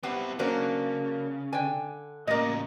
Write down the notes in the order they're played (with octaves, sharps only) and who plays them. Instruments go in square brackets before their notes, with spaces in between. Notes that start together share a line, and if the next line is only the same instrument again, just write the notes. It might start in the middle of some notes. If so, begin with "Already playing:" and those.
[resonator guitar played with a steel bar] B3 [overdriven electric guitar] C4 E4 [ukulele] G4 F5 F#5
[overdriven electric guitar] C#3 [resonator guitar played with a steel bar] F#3 A#3 D4 [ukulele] C5
[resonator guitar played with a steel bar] D3 [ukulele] G5 G#5
[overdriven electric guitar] A2 C#3 [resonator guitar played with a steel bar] A#3 D#5